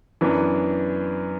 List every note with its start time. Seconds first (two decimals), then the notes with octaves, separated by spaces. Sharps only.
0.21 F#2 E3 B3 D4